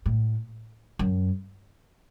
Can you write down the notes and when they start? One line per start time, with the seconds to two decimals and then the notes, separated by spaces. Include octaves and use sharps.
0.06 A2
0.99 F#2